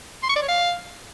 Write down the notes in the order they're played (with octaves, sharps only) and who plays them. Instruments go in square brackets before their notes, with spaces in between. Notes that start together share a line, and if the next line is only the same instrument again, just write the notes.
[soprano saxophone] C6
C#6
D5
C#5
F5